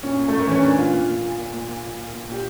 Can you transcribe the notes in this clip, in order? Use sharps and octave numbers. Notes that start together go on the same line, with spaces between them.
A#2 C#4
A#2
A2 A3
A#3
E3 C#4
A#2 D4
A#2 F4
A#2
A#2
A#2
A#2
A#2
A#2
A#2
A#2
A#2
A#2 G4